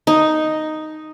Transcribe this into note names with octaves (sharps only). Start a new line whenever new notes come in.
D#4